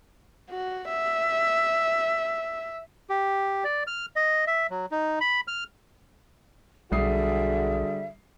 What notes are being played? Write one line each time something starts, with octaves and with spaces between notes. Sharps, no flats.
F#4
E5
G4
D5
F6
D#5
E5
F#3
D#4
B5
F6
B1 D3 G3 F#4 G#4 E5 D#6 C7